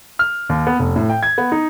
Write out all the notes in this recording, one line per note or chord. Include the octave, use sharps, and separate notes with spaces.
F6
D#2
B3
F1
A2
G5
G#6
B3
D#4